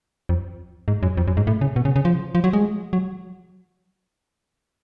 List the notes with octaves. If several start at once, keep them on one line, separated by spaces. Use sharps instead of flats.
F2
G#2
F#2
F2
F#2
G#2
A2
C#3
B2
C#3
C#3
F3
F3
F#3
G#3
F#3